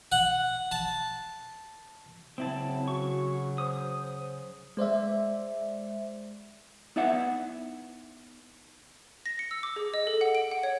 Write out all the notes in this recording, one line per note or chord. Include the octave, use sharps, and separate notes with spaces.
F#5
A5
C#3 F#3 C4 E4 A5
F#4 C#6
C5 D#6
G#3 C5 D5 E5
B3 D#4 E4 D5 E5 F#5
A#6
C#7
E6
D6
G#4
D#5
A4
F#5
D7
F#5
C#5